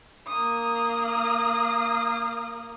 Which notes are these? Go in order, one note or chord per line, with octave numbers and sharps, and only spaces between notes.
A#3 D#6